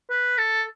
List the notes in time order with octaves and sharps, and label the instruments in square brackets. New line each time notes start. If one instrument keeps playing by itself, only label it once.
[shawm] B4
A4